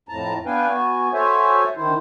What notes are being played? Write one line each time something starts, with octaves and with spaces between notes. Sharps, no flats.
F2 A2 A5 A#5
B3 D4 B4 F5 G5 G#5
B3 F#4 G#5
F#4 A4 C5 C#5 E5 G#5
D2 D#3 E4 C5